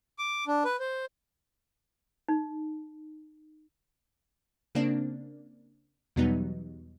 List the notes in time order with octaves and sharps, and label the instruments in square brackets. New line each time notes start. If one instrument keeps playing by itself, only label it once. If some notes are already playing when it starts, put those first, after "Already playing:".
[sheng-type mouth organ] D6
D4
B4
C5
[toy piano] D#4
[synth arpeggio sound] C#3 A#3 C4 D4
E2 B2 F#3 G3 B3 D#4